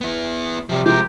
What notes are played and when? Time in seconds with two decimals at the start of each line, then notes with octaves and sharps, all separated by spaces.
0.01 B3 E4
0.69 C3 F3 G3
0.86 C3 F3 G#3 G4 A#4